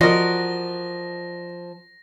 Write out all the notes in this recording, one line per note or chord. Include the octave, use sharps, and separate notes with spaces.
F3 F#4 A#4 D5 D#5 C6 A#6